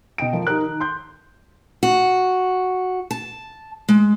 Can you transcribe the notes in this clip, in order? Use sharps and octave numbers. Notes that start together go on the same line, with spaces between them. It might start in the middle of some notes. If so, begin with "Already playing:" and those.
B2 D#5 G5 D7
F3 A#4
D#4 G4 A#4 F#6
D#3
C6 G6
F#4
A5
G#3